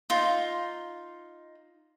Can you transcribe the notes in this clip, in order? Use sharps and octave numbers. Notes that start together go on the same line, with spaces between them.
D#4 F4